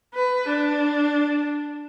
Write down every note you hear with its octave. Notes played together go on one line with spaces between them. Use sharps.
B4
D4